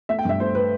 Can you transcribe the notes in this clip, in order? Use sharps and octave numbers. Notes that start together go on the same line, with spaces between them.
A3 E5
G5
G2 E5
A3 C5
B4